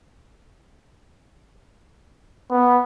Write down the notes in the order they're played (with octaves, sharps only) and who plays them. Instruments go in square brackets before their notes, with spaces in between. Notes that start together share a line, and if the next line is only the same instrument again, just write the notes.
[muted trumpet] B3